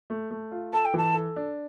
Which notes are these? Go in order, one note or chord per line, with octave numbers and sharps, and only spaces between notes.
A3
A3
F4
A4 A5
G5
E3 A5
A4
D4